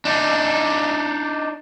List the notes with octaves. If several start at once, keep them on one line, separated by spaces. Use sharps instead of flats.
D4 D#4